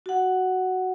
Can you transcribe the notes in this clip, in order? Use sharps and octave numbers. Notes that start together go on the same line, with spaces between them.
F#4 F#5